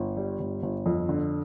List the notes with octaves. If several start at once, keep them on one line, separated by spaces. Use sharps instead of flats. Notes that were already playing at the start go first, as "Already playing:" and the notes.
Already playing: G1
G3
G1
G1
F2
D3